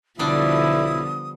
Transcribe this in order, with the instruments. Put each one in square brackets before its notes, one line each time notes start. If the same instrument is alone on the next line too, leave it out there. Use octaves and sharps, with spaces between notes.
[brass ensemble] B1 E4 [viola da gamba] D3 F3 B3 [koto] G3 D4 [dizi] D#6